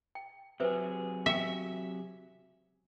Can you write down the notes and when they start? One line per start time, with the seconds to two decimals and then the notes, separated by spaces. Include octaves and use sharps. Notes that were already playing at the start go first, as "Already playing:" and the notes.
0.15 G5
0.60 C3 F#3 G#4 B4 C5 E5
1.26 E5 F5 G5